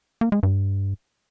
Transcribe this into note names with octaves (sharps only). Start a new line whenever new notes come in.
A#3
G#3
G2